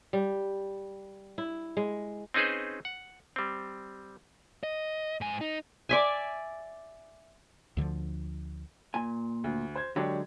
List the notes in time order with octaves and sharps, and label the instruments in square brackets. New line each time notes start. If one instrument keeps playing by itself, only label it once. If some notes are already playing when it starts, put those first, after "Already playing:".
[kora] G3
E4
G#3
[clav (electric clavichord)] C4 C#4 D#4 G#4 B4 C5
F#5
G3 C4
[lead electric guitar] D#5
G#2 G#5
D#4
[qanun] D5 E5 G#5
[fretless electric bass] D2 D3 D#3 F3
[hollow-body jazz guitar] A#2 G#5
[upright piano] D2
C5 G#6
[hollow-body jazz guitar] D3 F#3 G#3 [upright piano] G4 C#5 D5